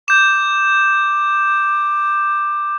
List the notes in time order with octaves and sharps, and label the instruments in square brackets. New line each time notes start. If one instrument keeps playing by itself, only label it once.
[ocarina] D6 [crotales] G6 E7